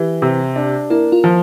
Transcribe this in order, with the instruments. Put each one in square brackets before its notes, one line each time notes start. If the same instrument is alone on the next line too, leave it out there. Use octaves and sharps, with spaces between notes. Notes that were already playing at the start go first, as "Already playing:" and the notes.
Already playing: [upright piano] E3 [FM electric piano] G4
[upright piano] C3
D4
[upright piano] A#3 [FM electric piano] E4
[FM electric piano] F4
[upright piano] F3